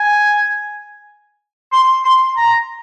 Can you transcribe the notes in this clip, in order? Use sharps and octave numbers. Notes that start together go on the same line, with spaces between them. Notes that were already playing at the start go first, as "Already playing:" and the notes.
Already playing: G#5
C6
C6
A#5